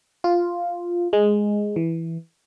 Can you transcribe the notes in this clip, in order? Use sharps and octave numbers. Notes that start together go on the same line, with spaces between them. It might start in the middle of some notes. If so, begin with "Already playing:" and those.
F4
G#3
E3